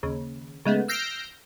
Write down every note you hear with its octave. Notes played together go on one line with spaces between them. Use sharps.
D#2 C#3
C#3 G#3 A3 B3
E6 F6 G6 A#6 C7 D7